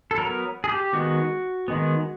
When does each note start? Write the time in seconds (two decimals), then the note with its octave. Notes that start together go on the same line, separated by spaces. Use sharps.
0.11 A4
0.18 F#3 B3 A#4
0.64 G#4
0.69 G4
0.93 D#3 G#3 B3 F#4
1.68 D#3 G#3 B3